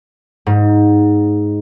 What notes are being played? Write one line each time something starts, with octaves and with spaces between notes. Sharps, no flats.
G#2